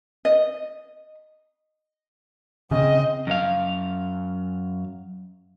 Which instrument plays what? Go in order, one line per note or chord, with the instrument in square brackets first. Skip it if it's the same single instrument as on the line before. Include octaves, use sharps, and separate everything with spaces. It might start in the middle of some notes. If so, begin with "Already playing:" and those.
[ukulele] D#5
[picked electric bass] C#3 [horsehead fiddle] C4 D#5
[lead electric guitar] F#2 F5